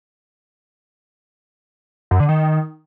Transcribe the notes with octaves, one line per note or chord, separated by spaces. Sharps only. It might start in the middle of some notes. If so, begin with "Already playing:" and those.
F#2
D3
D#3